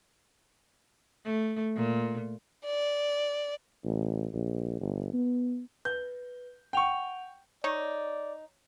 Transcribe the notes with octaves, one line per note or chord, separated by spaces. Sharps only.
A3
A#2
D5
A1
A#1
G1
B3
B4 G6
F#5 G5 C#6 F7
D#4 C#5 D5